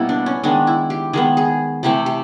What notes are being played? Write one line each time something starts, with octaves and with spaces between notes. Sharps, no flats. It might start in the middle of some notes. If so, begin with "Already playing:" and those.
Already playing: B2 G3 A#3 E4
D4
C#4
D#3 G#3 B3 D4
E4
G4
D#3 G#3 B3 G#4
G#4
C3 E3 A3 C4 G4
G4